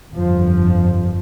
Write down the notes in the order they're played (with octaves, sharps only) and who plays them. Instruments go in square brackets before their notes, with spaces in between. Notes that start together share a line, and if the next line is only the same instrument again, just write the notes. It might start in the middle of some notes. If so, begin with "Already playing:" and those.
[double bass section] G1 F2 F3